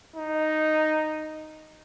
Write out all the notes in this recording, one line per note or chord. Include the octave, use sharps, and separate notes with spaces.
D#4